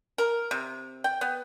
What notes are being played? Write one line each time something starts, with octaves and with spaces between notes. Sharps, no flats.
A#4
C3
G5
B3